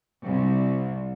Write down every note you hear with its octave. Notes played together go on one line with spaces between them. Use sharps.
C2